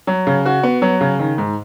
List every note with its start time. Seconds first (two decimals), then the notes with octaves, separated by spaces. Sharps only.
0.07 F#3
0.27 C#3
0.45 F#4
0.63 B3
0.82 F#3
1.01 C#3
1.19 D#3
1.38 G#2